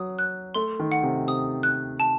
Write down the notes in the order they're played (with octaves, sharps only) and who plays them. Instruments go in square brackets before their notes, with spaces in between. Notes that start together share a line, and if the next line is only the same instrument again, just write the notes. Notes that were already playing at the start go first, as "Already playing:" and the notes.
Already playing: [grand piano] F#3 [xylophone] D#6
[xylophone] F#6
[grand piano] A3 [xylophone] C6
[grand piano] D#3
[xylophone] F#5
[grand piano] C3
[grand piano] C3 [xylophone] D#6
[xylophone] F#6
A5